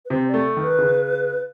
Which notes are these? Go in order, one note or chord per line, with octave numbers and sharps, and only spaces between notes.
B4
C3 C5
D5
A3
D#3
B4
C#3